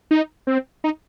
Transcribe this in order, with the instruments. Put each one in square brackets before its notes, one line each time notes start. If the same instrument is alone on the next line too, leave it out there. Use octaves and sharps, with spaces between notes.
[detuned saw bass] D#4
C4
D#4